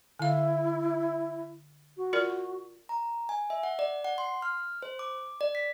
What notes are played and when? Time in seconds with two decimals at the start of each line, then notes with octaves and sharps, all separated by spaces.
0.19 D3 E4 F5
1.97 F#4
2.13 F4 A#4 D5
2.89 A#5
3.29 G#5
3.50 E5
3.63 F#5
3.79 D5
4.05 F#5
4.18 C6
4.42 F6
4.82 C5
4.99 D6
5.41 D5
5.55 B6